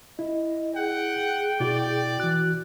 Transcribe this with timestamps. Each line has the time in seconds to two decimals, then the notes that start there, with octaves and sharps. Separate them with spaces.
0.19 E4 D#5
0.76 G#4 F#5 G5
1.60 B2 E4 F#4 D5
2.20 E3 F#4 F#6